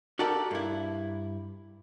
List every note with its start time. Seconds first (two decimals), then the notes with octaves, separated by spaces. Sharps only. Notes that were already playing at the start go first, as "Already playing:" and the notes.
0.19 F#4 G4 A4 A#4 D5 F#5
0.51 G2 E4